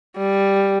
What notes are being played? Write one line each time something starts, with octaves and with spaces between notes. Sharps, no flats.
G3